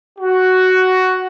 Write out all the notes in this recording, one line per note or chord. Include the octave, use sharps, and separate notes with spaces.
F#4